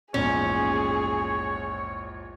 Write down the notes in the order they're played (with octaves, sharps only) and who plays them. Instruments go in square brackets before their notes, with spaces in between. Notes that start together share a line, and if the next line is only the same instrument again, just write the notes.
[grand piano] A#1 E2 G#2 [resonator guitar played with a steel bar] C#4 [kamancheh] G#4 [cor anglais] C#5